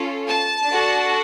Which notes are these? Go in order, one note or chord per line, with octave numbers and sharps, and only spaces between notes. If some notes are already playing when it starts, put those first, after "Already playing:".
Already playing: C#4 F4 A4
A5
D4 F#4 A4